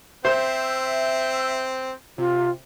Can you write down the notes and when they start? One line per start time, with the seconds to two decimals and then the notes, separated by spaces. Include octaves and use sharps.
0.25 C4 C5 E5
2.18 C3 F4